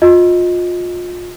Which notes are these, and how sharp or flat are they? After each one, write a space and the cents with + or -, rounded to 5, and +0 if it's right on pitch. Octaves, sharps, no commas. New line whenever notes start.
F4 +30 D#5 +10